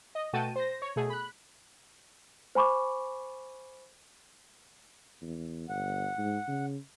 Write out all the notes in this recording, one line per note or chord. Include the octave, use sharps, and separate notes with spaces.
D#5
B2 A3 F#4 G5 A5 D#7
C5 A#6
C#5
B2 A3 G#4
B5 F#6
C5 G#5 B5 C#6 D6
E2
G1 F#5
G#2
C#3